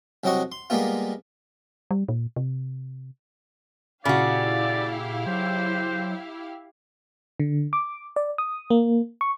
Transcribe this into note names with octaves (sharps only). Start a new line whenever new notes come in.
C2 F#3 C4 D#5 F#5 C#6
C6
G3 G#3 A#3 B3 F4
G3
A#2
C3
A#2 C#3 E4 F#4 G4 D5 F5
F#3 C5
D3
D6
D5
D#6
A#3
C#6